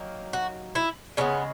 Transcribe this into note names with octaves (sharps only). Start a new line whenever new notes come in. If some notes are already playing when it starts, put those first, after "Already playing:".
Already playing: D#3 F#3 A#3
F#4
E4
C#3 G#3 B3 C#4